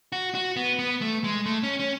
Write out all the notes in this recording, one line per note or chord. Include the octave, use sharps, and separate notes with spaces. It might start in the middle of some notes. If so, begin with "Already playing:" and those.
F#4
F#4
B3
B3
A3
G#3
A3
C#4
C#4